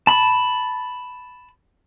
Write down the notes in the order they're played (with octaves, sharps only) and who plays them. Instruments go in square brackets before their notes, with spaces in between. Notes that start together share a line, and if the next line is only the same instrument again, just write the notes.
[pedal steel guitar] A5 B5